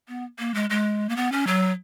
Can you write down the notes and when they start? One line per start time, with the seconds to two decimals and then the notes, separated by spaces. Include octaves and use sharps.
0.08 B3
0.39 A#3
0.54 G#3
0.70 G#3
1.09 A#3
1.17 B3
1.32 C#4
1.47 F#3